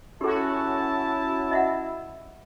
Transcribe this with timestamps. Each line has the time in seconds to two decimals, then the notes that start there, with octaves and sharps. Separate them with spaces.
0.21 C#4 E4 F#4 G4 A4 A5
1.51 D#5 E5 F#5